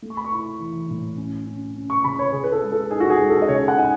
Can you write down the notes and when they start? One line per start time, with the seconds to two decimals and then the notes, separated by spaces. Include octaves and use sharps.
0.02 A3
0.10 C#6
0.17 B5
0.25 C#6
0.31 E4
0.60 E3
0.89 A2
1.17 C#4
1.47 C#4
1.75 C#4
1.90 C#6
2.04 C#3 B5
2.19 C#5
2.33 C#3 G#4
2.44 B4
2.52 A4
2.62 G#3
2.72 A4
2.91 D#4 G#4
3.00 F#4
3.10 G#4
3.19 G#3
3.29 A4
3.42 D#5
3.48 C#3 C#5
3.68 F#5
3.77 D#4 G#5